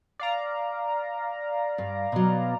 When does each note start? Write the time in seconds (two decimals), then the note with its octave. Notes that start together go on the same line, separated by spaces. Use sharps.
0.19 D5 F5 A#5
1.78 G2
2.12 B2 F#3